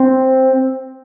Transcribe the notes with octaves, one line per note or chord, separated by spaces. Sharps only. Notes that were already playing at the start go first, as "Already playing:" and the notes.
Already playing: C4